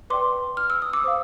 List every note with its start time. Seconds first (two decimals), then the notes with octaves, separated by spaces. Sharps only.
0.10 B4 D5 G5 C6 D6
0.57 F6
0.70 E6
0.82 D#6
0.93 D6 E6
1.04 C5 F5